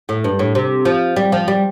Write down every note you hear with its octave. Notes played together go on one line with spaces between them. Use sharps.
A2
G2
A2
C3
F3
G3
F3
G3